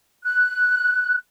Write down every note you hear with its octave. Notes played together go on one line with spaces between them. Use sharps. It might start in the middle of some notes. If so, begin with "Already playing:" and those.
F#6